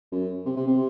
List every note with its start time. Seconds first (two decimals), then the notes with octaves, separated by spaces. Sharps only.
0.12 F#2
0.45 C3
0.57 C3
0.67 C3